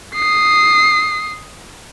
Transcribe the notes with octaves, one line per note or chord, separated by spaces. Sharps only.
D#6 C7